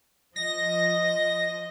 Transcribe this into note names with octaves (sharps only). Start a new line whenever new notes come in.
F3 D#5 A#6